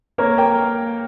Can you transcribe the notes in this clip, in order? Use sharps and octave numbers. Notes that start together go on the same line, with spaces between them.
A#3 A#4 C#5
A#3 G5 A#5